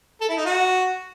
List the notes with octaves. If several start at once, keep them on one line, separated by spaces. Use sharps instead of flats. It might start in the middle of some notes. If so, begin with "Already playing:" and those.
A4
E4
D#4
F#4